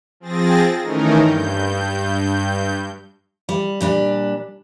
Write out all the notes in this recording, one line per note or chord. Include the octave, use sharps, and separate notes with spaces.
F3 C4 G#4 A6 A#6
D#3 E3 A3 C#4 D#4 A#4
G2 G6
G3
A#2 G3 D4